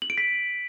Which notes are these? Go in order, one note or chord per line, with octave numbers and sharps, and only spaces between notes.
F#7
D7
B6